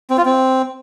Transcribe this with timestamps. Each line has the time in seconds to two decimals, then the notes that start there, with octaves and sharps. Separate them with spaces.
0.10 C4
0.18 F4
0.25 C4